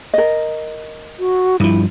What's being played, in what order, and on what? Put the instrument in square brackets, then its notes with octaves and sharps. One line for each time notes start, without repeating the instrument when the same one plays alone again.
[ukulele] A#4 D#5
[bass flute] F#4
[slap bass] G2 F3 [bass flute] E4